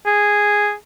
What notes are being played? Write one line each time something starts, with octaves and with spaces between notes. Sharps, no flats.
G#4